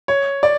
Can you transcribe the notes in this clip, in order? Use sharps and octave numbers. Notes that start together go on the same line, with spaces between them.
C#5
D5